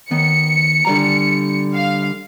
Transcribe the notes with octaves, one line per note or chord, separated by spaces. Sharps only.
D#3 B3 C#7
D3 G3 A#5
F5